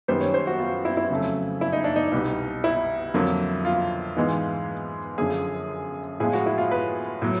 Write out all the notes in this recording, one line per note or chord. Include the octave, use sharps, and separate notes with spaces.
F#2 D#3 G3 B3 C5
C#5
C5
F#4
F4
E4
E4
F2 C#3 F#3 A3
E4
D#4
D4
D#4
C2 B2 G3 B3
E4
F2 D3 F#3 A#3
F4
G#2 E3 G#3 B3
F#2 D3 F3 G#4
A2 F3 G#3 G#4
F#4
E4
F4
B4
A2 F#3